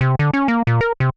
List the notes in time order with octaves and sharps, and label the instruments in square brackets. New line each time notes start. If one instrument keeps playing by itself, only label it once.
[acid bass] C3
D3
C#4
A#3
A#2
A#4
C3